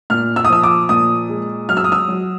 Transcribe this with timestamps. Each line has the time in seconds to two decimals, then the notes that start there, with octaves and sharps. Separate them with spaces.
0.10 A#2 F6
0.36 E6
0.45 D#6
0.50 F3 E6
0.63 D6
0.89 A#2 D#6
1.29 G#3
1.69 F#3 F6
1.77 E6
1.84 D#6
1.92 E6
2.08 F#3